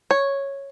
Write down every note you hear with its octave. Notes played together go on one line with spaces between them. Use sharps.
C#5